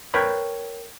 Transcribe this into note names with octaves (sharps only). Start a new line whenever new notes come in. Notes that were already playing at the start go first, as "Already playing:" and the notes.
A#4 B4 C#5 G5 B5